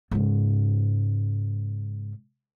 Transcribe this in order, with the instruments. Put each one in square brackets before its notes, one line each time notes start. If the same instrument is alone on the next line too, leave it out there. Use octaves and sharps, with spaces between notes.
[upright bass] G#2 C#3